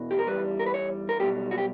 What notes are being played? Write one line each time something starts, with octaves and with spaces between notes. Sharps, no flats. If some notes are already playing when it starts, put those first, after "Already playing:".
Already playing: E2 B2
G4
A#4
E2 B2 G3 B4
A#4
B4
C#5
A#4
B1 B2 G3 G4
F#4
G4